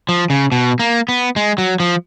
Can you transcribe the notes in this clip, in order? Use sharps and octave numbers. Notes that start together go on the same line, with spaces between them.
F3
C#3
B2
A#3
B3
G#3
F#3
F3